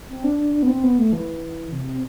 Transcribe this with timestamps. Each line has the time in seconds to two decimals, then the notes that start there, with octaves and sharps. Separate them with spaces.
0.09 C4
0.24 D4
0.38 D4
0.54 D4
0.63 B3
0.67 C4
0.83 B3
0.98 A3
1.13 E3
1.72 C3